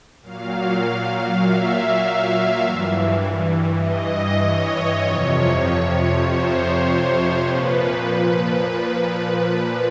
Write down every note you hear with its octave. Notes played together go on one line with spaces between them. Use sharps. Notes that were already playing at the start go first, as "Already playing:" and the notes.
A#2 F#3 F5
E5
G2 E3
D#5
C#5
F2 C3 F3 C#5
C5
A#2 F3 B4